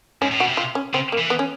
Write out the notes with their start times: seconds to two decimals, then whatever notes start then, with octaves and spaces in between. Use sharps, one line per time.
0.22 G#2 C#4
0.31 A2
0.39 B2 F#4
0.49 C3
0.57 F4
0.75 C#4
0.94 C#3 C4
1.12 A#3
1.18 E3
1.30 B3
1.39 C#4